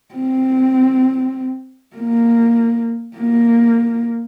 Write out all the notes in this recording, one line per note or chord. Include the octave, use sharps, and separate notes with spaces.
C4
A#3
A#3